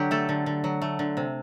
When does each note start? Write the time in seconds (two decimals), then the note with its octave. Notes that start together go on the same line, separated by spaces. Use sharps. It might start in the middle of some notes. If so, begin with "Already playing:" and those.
Already playing: D3 F#3 D4 G4
0.11 A3 A4
0.29 D3
0.46 D3
0.64 F#3
0.82 A3
0.99 D3
1.17 C3